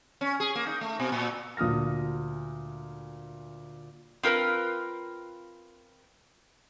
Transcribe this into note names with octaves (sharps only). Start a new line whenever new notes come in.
C#4
G#4
A#3
D#4
A3
B2
A#2
D2 A#2 D#6 F6 A#6
C4 F4 A#4 B4